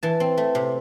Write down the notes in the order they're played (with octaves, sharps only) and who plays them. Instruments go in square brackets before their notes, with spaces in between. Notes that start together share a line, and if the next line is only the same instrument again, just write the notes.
[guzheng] E3 A5
C4
A3
C3